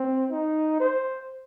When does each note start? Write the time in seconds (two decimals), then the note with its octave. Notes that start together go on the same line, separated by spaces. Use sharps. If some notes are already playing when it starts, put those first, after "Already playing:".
Already playing: C4
0.31 D#4
0.80 C5